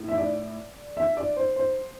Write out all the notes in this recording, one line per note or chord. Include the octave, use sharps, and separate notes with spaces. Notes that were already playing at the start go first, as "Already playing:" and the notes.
Already playing: A2
E5
D5
E5
D5
C5
C5